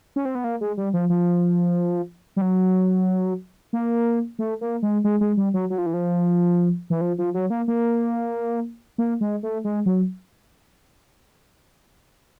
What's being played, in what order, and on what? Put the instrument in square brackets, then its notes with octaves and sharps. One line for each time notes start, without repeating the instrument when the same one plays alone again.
[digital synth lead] C#4
C4
B3
A#3
G#3
G3
F3
F3
G3
F#3
A#3
A3
A#3
G#3
G#3
G#3
G3
F#3
F#3
F3
E3
F3
E3
F3
F3
F#3
A#3
A#3
A#3
G#3
A3
G#3
F#3